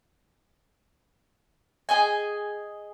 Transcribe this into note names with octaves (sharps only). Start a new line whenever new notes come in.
G#4 D#5 G#5